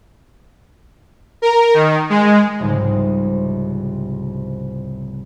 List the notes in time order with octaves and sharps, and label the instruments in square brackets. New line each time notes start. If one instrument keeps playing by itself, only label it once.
[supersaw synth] A#4
D#3
G#3
[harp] F1 C2 G#2 C#3